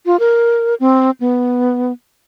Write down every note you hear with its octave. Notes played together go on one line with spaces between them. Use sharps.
F4
A#4
C4
B3